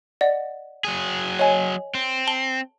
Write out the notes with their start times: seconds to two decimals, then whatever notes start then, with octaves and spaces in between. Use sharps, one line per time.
0.21 D5 D#5 F#5
0.85 F#3 G#4
1.39 C#5 D#5 G#5
1.94 C4
2.27 A5 G7